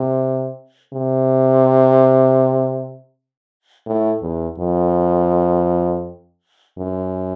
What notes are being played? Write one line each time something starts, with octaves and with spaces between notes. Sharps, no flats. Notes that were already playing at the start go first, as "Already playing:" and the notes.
Already playing: C3
C3
A2
E2
F2
F#2